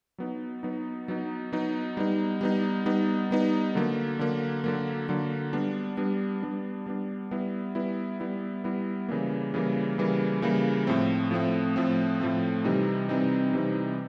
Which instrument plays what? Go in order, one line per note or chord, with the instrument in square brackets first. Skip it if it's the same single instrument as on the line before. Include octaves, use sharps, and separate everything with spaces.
[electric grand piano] F#3 B3 D#4
F#3 B3 D#4
F#3 B3 D#4
F#3 B3 D#4
G3 B3 D#4
G3 B3 D#4
G3 B3 D#4
G3 B3 D#4
D3 F#3 A#3
D3 F#3 A#3
D3 F#3 A#3
D3 F#3 A#3
G3 B3 D4
G3 B3 D4
G3 B3 D4
G3 B3 D4
G3 B3 E4
G3 B3 E4
G3 B3 E4
G3 B3 E4
C#3 E3 G3 A#3
C#3 E3 G3 A#3
C#3 E3 G3 A#3
C#3 E3 G3 A#3
A2 F3 A3 C4
A2 F3 A3 C4
A2 F3 A3 C4
A2 F3 A3 C4
C3 E3 G3 C4 D#4
C3 E3 G3 C4 D#4
C3 E3 G3 C4 D#4